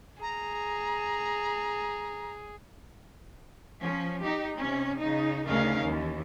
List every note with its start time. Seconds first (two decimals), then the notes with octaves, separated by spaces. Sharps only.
0.21 G#4 A#5
3.80 F3 C#4
4.22 D#4 G4
4.58 C3 C#4
5.01 C#3 D#4
5.46 D2 C#3 C#4 D#4 A#4 F5
5.84 D#2 E3